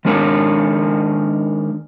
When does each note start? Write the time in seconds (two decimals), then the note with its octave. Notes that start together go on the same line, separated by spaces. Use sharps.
0.05 D#3 G#3 D4 A#4 C#5